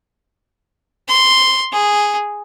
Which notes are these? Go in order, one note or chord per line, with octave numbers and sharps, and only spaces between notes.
C6
G#4